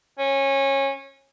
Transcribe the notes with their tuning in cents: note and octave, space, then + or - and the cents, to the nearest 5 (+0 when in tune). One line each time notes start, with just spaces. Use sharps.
C#4 -20